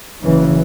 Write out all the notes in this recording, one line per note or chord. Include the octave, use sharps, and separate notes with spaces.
F#1 F#2 C#3 E3